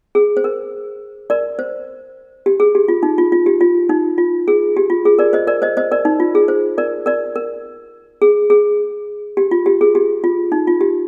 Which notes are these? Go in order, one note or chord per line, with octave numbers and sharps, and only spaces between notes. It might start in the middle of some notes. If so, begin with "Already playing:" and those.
G#4
C5
A#4
A#4 D5
C5
G4
G#4
G4
F4
D#4
F4
F4
G4
F4
D#4
F4
G#4
G4
F4
G#4
A#4 D5
C5 D#5
A#4 D5
C5 D#5
C5 D#5
A#4 D5
D#4
F4
G#4
C5
A#4 D5
A#4 D5
A#4
G#4
G#4
G4
F4
G4
G#4
G4
F4
D#4
F4
G4